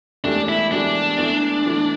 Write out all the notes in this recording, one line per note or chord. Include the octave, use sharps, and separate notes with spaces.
E1 E2 E3 A3 D4 G4
E4
E1 E2 E3 A3 D4 G4
E2 E3 A3
E2 E3 A3